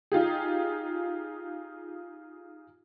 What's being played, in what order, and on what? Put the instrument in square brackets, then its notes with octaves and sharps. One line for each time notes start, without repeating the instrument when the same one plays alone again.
[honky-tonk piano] D#4 F4 G4 G#4